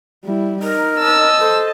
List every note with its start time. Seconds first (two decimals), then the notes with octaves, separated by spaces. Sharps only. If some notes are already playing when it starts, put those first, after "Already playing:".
0.24 G3 E4
0.63 D#4 A#4
0.99 D#5 A5 E6
1.39 A4 C5